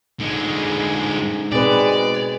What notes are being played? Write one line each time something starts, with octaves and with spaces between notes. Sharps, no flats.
G#2 D3 G#3
B2 G#3 C4 B4 D5